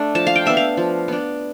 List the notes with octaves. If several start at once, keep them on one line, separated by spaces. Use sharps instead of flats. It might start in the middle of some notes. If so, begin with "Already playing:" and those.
Already playing: A3 D4
F3 A5
F5
G5
B3 D4 E5
F5
F3
B3 D4